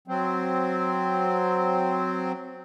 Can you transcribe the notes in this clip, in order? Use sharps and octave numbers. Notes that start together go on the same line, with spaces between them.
F#3 C4